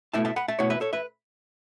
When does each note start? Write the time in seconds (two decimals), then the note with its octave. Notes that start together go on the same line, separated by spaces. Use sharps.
0.13 B2 A3 E4 E5 A5
0.25 E5 A5
0.36 F#5 B5
0.48 E5 A5
0.59 B2 A3 E4 C#5 F#5
0.70 B4 E5
0.81 A4 C#5
0.93 B4 E5